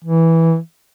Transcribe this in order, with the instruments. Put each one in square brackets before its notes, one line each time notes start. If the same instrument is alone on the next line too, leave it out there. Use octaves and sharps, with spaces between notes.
[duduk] E3